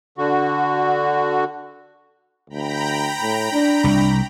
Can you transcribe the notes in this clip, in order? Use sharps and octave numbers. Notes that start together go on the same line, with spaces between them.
D3 F#4
D2 G5 A#5 B5
A2
D4
C2